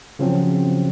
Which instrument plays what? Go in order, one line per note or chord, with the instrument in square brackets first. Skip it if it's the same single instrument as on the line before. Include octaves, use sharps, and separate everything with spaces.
[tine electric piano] C#3 F3 F#3 C4